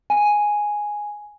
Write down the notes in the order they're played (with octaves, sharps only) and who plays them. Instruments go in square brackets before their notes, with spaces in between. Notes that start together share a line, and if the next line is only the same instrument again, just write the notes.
[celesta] G#5